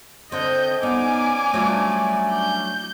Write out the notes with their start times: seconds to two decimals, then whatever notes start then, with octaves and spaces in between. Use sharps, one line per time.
0.32 D3 C4 D#5 G6
0.83 B3 C#4 D#4 D5 G#5 D6
1.54 F#3 G3 A3 D4 F4
2.33 G6